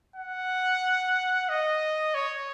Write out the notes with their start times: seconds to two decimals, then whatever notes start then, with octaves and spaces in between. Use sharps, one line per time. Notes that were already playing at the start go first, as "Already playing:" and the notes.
0.16 F#5
1.49 D#5
2.14 C#5